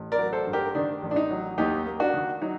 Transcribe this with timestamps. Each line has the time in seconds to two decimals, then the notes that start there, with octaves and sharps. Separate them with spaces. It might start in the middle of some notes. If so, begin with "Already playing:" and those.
Already playing: A1
0.12 A#4 D5
0.19 F#3
0.33 A4 C5
0.47 G2
0.53 G4 A#4
0.75 D#3 D4
1.02 A1
1.11 D4
1.16 D#4
1.31 F#3
1.58 D#2 D#4 G4
1.86 A#3
2.00 D4 F#4
2.14 D#3
2.42 F#3 D#4